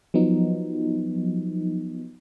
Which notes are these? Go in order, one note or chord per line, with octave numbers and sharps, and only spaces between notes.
F3 F#3 B3 D#4